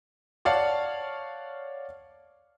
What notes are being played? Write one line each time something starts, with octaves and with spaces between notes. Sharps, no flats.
C#5 D5 F5 F#5 A5